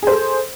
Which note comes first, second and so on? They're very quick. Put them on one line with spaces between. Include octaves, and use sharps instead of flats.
G#4 C5 A4